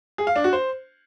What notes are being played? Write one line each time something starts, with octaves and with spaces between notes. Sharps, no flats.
G#4
F5
D4
F#4
C5